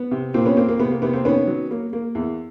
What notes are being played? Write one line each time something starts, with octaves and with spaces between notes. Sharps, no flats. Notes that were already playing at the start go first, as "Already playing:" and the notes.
Already playing: B3
C3
A#2 A#3 C4
B3 C#4
A#3 C4
A#3
C3 B3
A#3
C3 B3
A#3 C4
D#3 B3 C#4
F#3
A#3
A#3
E2